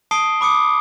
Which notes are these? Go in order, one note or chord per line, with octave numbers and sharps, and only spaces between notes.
A5 D#6 C7 D7 G7
B5 D6 D#6 C#7